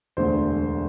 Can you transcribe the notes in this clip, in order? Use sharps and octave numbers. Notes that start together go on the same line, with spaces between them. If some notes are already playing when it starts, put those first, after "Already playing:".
E1 D2 D3 C5